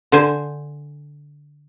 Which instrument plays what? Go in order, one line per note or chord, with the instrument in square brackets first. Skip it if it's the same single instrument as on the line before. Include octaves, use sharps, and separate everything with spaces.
[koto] D3 C5 G#5